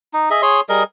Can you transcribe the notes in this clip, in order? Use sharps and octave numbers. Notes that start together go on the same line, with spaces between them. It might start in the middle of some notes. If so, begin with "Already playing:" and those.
D#4
G#4 D#5 E5
G#4 C#5 C6
G3 G#4 A#4 D#5